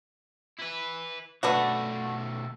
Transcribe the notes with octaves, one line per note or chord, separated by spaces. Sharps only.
E4 B4
B1 A3 B3 D4 F#4